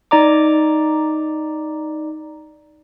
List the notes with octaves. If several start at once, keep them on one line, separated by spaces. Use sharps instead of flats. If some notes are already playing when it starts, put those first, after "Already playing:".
D#4 D5 A#5 D6